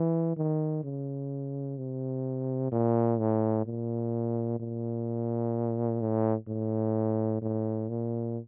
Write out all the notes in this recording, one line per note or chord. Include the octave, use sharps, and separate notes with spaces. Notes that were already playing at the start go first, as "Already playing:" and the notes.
Already playing: E3
D#3
C#3
C3
A#2
A2
A#2
A#2
A2
A2
A2
A#2